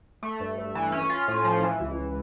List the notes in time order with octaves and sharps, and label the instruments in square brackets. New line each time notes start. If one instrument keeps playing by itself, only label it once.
[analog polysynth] A3
G2
G2
E3
C#4
F4
A2
F3
E3
C#2